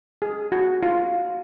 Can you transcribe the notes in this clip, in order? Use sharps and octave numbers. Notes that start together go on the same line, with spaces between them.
G#4
F#4
F4